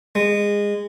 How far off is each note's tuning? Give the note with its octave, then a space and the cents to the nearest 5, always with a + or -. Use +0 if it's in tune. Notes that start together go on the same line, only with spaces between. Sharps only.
G#3 -20